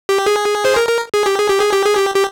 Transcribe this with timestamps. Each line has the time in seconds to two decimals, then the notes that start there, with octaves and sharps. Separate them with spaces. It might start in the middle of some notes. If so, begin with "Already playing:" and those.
0.09 G4
0.26 G#4
0.65 C5
0.76 A#4
0.88 A#4
1.14 G#4
1.26 G4
1.38 G#4
1.50 G4
1.61 G#4
1.73 G4
1.85 G#4
1.97 G4
2.15 G4